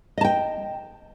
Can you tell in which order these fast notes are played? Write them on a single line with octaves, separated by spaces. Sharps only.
D#5 A5 G5